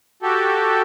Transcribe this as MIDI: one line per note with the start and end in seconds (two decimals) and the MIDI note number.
0.23 0.82 66
0.23 0.82 67
0.23 0.82 69